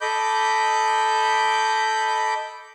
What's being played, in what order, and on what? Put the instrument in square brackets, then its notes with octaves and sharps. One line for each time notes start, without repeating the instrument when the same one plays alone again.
[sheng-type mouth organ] A4 D#5 B5 D6 G6